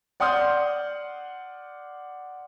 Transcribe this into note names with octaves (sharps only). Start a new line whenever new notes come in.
D5 F#5 C6 D#6 F6 G6